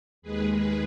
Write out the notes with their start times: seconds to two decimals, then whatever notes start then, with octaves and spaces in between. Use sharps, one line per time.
0.22 D#2 D#3 G#3 G#4 B4
0.54 G#4 B4